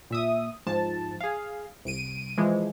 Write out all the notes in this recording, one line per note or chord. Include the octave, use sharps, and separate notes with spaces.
A#2 E5 D#6
G#2 F3 A5
G#4 F5
C2 D7 D#7
E3 F3 G#3